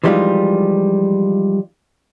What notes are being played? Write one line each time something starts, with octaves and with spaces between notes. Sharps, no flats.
E3 F3 G3 G#3 D#4 F4